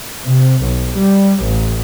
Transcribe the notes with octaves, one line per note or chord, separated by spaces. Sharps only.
C3
B1
G3
A1